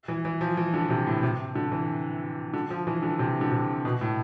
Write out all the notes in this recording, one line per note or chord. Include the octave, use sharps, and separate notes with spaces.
E3
E3
F3
E3
D3
C3
A2
C3
D3
E3
D3
F3
E3
D3
C3
D3
C3
B2
A2